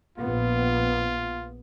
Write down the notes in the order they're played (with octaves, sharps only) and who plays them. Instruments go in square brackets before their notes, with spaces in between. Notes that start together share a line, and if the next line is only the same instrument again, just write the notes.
[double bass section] A#1 B3 [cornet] F4